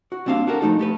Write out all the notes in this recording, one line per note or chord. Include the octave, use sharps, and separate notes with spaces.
F#4
G3 A#3 C4 D4 F5
D4 F#4 G4 A4 A#4
F3 A3 D#4 A4
A3 G4 B4